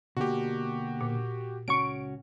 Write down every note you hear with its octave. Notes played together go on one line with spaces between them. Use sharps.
B2 D3 A#3 F#4 G4
A#2
C#2 C#4 F#4 C#6 D7